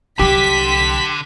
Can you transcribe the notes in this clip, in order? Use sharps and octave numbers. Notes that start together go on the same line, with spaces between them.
C2 D3 F#3 G4 B6